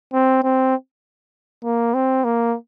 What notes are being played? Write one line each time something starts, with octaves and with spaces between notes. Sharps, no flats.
C4
C4
A#3
C4
A#3